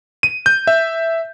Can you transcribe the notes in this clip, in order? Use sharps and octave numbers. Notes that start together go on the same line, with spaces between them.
D#7
G6
E5